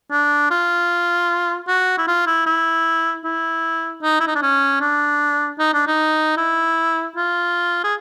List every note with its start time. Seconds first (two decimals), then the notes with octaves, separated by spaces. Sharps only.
0.11 D4
0.51 F4
1.68 F#4
1.98 E4
2.07 F4
2.26 E4
2.46 E4
3.25 E4
4.03 D#4
4.20 E4
4.27 D#4
4.35 D4
4.42 C#4
4.81 D4
5.59 D#4
5.74 D4
5.87 D#4
6.37 E4
7.16 F4
7.84 G#4